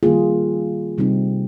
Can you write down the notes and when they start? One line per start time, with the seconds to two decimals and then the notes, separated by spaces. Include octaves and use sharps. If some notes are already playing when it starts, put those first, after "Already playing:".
0.03 D#3 G3 A#3 D#4 F4 G#4
0.98 C3 G3 C4 D#4